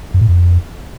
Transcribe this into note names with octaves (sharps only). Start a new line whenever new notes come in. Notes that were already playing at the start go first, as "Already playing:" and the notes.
F#2
A2
F2